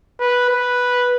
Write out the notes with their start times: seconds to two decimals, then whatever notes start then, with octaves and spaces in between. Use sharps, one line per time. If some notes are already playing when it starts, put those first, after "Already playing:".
0.20 B4
0.50 B4